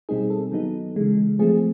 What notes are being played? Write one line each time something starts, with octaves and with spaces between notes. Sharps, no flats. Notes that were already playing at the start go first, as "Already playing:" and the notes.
B2 G3 C4 D#4 G#4
A4
D#3 F#3 B3 D#4
C#3 E3 G#3
F3 A3 C4 G#4